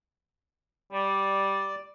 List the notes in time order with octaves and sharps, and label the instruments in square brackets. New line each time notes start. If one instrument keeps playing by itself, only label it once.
[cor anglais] G3 [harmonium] D5